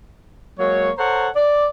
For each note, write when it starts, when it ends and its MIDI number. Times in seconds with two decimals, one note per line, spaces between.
0.59 0.90 54
0.59 0.90 56
0.59 0.90 58
0.59 0.90 73
0.98 1.29 69
0.98 1.29 72
0.98 1.29 73
0.98 1.29 78
0.98 1.29 82
1.36 1.67 74